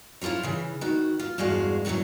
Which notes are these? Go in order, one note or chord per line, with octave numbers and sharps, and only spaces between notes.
E4 F4 G#4 C5 C#5
C#3 E3
D#3 F#4
F4
E2 G2 G#3 F#4 F5
F#2 A2 D3 E3 F#3